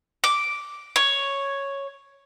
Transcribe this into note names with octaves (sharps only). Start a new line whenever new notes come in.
D6
C#5